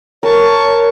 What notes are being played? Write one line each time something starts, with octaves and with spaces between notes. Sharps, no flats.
A#4 C#5 A5 C#6